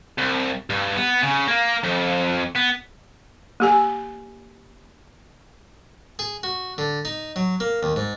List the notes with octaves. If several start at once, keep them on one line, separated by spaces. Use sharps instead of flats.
C2
G2
B3
C#3
A#3
F2
B3
A#3 G4 G#5
G#4
F#4
D3
D#4
F#3
A#3
D#2
G#2